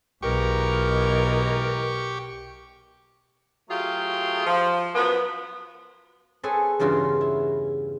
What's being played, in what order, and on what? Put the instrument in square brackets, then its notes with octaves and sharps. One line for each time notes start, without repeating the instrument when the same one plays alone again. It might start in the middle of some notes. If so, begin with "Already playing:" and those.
[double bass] B1 [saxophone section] E3 G#3 A#4 [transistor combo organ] G4 C#6
[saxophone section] F#3 A3 F4 G4 G#4
F3
F#2 F3 B3
[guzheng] C4 G#4 A4 B4 C#5 G#5
E2 G2 C#3 F4 F#4
E4